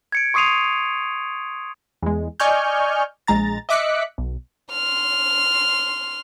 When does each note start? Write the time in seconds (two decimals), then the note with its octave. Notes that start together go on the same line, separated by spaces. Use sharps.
0.12 G#6 C#7 D7
0.34 C6 C#6 D#6 C7 D#7 F7
2.02 E2 G#3
2.40 D5 D#5 G#5 C#6 F6 G6
3.27 A#1 G#3 A#5 A6
3.69 D#5 E5 D6 F#6 B6 C#7
4.18 B1
4.73 C6 F6